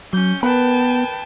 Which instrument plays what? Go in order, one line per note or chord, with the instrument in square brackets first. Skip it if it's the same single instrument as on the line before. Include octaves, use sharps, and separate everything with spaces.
[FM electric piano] F#3 [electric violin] C#4 G6
[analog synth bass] B3 [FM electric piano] A#4 [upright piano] B4 [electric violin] G5 A5